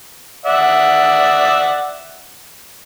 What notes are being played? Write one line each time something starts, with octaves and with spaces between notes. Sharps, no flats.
D5 E5 F#5